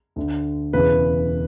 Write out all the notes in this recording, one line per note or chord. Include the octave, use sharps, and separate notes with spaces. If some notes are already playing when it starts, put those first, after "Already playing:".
D2 D3
E1 E2 C#3 B4